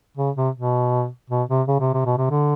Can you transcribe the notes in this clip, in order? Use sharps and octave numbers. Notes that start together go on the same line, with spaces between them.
C#3
C3
B2
B2
C3
C#3
C3
C3
B2
C3
D3